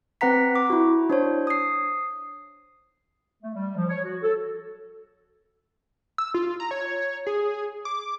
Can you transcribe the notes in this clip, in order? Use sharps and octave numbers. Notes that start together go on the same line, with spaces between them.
C4 B4 F#5 A#5 B6
D6
E4 F#4
D4 C5 C#5
D#6 C7
A3
G3
F3
C#5
F#4
A4
E6
F4
A#5
C#5
G#4
D6